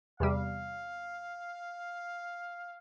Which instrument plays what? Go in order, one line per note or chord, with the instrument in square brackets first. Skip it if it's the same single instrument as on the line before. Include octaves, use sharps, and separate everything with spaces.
[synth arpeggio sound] E2 C3 G3 [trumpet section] F5